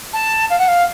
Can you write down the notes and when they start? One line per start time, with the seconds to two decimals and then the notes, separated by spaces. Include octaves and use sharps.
0.13 A5
0.50 F5
0.58 F#5
0.68 F5